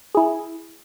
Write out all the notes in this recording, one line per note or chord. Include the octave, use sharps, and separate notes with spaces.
E4 G#4